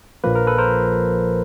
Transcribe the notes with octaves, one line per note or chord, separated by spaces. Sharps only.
A#1 A#2 F3 A#3 B4
A#4
A4 B4
A#4 C5